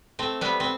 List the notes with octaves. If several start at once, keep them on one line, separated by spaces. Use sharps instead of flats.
A3 C4
G3 B3
C4